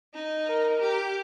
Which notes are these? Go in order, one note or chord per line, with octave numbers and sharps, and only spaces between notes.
D#4
A#4
G4